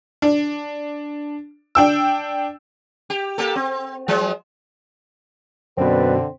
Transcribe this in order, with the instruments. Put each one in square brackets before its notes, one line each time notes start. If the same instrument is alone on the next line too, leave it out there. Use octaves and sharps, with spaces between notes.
[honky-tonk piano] D4
D4 G5 E6
[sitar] G4
A#3 G4 A4
C4
F3 F#3 G#3
[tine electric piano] F#2 B2 [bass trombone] D3 [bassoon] C4 [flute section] B4 D5